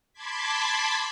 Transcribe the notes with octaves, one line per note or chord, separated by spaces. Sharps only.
A5 B5 C6 D6 G#6 B6